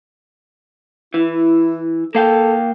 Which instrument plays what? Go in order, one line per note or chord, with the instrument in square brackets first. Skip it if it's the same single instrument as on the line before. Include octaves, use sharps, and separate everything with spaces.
[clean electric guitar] E3 [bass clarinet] E4
[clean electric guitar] A#3 F5 G5 [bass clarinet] A4